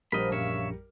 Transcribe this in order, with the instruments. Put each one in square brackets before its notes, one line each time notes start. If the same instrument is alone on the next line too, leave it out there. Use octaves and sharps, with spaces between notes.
[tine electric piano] A#1 [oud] F3 F#4 C5 [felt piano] G3 A#4 [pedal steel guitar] D#5 B5
[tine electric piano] A#1 F#2 C#7 [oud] A#2 C#3 [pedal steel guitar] C#5 E5